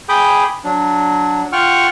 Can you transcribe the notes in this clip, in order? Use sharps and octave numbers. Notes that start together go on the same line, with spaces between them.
G#4 G5 B5 D6 D#6 G6
F#3 D4
F4 F#5 G5 C#6 F6